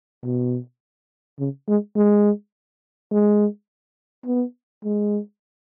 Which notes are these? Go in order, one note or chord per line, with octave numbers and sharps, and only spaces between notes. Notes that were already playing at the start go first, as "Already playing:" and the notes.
B2
C#3
G#3
G#3
G#3
B3
G#3